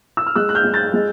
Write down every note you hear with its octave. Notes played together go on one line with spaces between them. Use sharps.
E6
F6
G#3 E6 F#6
F#6
F6 G6
G#3
G6 A6
G#3